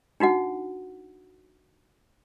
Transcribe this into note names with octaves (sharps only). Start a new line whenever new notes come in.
D4 D#4 F#4 F#5